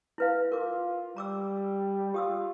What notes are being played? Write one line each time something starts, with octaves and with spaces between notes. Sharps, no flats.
E4 B4 F5
F4 A#4 D6
G3 A#5 D6 E6
F4 G4 D#6 E6